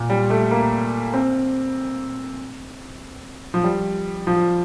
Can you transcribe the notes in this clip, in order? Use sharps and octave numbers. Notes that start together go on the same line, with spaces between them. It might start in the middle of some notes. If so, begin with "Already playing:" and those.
Already playing: A#2
G3
A3
A#3
C4
F3
G3
F3